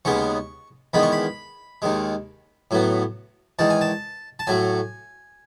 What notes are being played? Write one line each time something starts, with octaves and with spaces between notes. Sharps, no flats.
D#2 C#3 G#3 B3 C#6
E2 D#3 G#3 B3 B5
C#6
B5
D#2 D#3 G#3
A2 F#3 B3
E2 D#3 G#3 A5
G#5
A5
A5
A2 F#3 A3 G#5